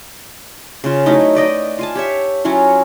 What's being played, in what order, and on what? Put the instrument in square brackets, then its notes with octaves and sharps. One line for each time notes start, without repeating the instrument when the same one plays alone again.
[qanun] C#3 F4
F#3 A3 D#4 E4
B4 D5 D#5 G5
F4 G#5 A5
G4 C#5 E5
F#3 C#4 E4 F4